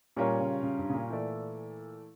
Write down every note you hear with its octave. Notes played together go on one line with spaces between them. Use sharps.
A#2 G3 C#4 F4 A#4 C#5
C#3
C#3
G2
C#3
A#2
E3 A3 E4 A4 D5